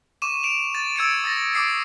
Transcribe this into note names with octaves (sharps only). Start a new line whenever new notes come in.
C#6 D6 D#7 E7
D7 E7 F7
A6
E6 G#6 C#7 D7
D#6 A6 A#6
D6 D#6 C7 D7